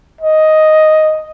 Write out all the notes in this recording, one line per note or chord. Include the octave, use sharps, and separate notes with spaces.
D#5